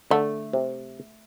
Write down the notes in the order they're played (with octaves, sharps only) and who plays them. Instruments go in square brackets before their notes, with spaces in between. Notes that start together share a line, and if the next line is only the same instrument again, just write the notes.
[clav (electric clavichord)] D3 [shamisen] A3
[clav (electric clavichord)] C3